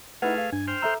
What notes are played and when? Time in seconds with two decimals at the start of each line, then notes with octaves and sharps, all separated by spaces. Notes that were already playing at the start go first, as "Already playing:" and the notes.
0.22 A3 D#4 E4 G#4 B4 F#5 F6
0.38 F5
0.52 G2 D4 G#5
0.68 C5 G5 F6
0.82 A4 E5 A#5 E6